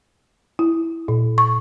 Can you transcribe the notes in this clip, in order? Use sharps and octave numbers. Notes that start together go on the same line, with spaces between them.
E4
A#2
C#6